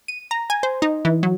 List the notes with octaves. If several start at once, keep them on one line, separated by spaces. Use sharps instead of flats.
D#7
A#5
G#5
C5
D#4
E3
F#3